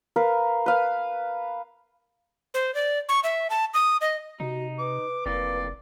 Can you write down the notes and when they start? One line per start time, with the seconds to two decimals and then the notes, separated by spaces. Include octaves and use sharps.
0.16 A#4 B4 F5
0.66 B4 F5
2.54 C5
2.75 D5
3.09 C#6
3.24 E5
3.50 A5
3.74 D#6
4.01 D#5
4.40 C3 D#4 F#4
4.79 B4 D6
5.26 F1 F2 E3 A#3 D5